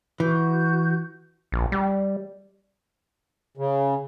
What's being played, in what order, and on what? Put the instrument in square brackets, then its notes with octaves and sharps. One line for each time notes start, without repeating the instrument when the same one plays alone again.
[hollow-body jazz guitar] E3 [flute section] F#4 G6
[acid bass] A#1
G3
[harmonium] C#3